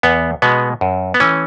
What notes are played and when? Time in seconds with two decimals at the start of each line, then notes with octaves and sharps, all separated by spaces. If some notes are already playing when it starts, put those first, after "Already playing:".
0.03 E2 B3
0.42 B2 G#3 B3
0.81 F#2
1.14 B3
1.20 E3 A3 C#4